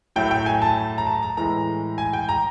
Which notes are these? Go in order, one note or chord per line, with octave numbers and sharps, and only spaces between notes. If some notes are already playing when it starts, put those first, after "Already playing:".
A2 F#3 A3 G5
G5
G#5
A5
A#5
A5
A#5
A2 E3 G#3 A#5
G#5
G5
A#5